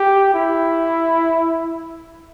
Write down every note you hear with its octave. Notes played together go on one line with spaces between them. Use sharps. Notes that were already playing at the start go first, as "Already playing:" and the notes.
Already playing: G4
E4